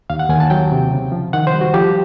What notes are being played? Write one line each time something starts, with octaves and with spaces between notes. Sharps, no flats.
D#2 F5
F#5
D#2 G#5
A5
F#3 G5
C3
C#3
F3
D#3 F#5
C5
G3
F#4
F3 G4